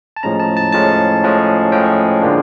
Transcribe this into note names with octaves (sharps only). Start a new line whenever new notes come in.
A5
A2 F3 G#3 C#4 A#5
A5
A5
A2 F3 G#3 C#4 A5
A2 F3 G#3 C#4
A2 F3 G#3 C#4 G5
D3 F3 A#3 D4